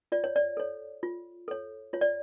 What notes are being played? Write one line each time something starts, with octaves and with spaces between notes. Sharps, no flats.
F4 D5
C#5
D5
A4 C#5
F4
A4 C#5
F4 C#5
D5